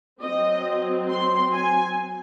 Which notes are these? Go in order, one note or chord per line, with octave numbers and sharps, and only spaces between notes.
F#3 C4 D#5
C6
G#5